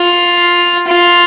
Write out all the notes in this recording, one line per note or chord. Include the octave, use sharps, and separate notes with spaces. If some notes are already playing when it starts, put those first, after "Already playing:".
Already playing: F4
F4